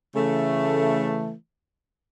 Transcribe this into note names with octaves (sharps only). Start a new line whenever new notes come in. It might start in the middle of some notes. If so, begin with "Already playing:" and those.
C#3 E3 A3